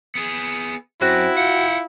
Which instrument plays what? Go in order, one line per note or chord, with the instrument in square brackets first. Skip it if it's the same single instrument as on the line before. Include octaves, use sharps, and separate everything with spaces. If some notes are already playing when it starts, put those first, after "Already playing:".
[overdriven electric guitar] B3 G#4
[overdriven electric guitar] F#2 [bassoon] C4 [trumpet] E4 [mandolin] F#4
[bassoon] F4 [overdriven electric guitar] F#5 G5